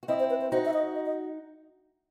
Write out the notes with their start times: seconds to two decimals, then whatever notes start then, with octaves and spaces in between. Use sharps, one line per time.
0.03 F#4
0.08 C4 E4 D#5
0.20 C5
0.30 B4
0.41 C5
0.52 D#4 F#4 C5
0.65 E5
0.73 D#5
0.95 D#5
1.06 D#5